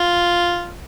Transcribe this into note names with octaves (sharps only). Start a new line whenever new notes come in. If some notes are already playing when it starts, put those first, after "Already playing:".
Already playing: F4